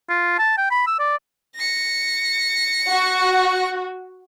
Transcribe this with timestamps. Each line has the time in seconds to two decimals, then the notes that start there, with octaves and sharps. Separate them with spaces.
0.09 F4
0.39 A5
0.58 G5
0.71 B5
0.87 E6
1.00 D5
1.56 A#6 C#7
2.89 F#4